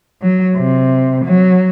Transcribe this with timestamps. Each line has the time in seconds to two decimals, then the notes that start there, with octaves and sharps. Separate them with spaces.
0.22 F#3
0.57 C3
1.25 F#3